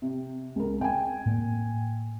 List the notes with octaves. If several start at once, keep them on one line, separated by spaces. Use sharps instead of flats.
C3
C#2 A#4
C4 G5 G#5
A2 A#3